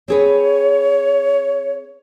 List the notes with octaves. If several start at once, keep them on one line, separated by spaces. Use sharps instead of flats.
C4 G#4 B4 C#5